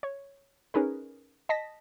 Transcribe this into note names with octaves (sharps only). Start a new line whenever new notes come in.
C#5
C#4 D#4 G#4 A#4 B4
D#5 A5 A#6 B6